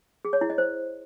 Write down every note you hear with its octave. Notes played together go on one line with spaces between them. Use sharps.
G#4
C#5
E4
D#5
C5